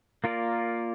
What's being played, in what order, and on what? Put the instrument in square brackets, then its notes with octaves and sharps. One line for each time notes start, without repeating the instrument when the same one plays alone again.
[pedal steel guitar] A#3 F4 A#4 D5